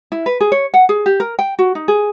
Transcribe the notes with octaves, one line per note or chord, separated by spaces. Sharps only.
E4
B4
G#4
C#5
F#5
G#4
G4
A#4
G5
F#4
D#4
G#4